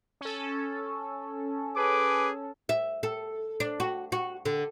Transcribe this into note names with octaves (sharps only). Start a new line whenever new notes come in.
C#4 A4
G#4 B4 D6
E5
A4
D4
F#4
F#4
D3